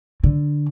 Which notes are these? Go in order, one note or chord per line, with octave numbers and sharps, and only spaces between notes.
D3